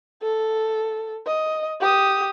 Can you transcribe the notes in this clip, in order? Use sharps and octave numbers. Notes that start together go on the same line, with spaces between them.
A4
D#5
G4 D#6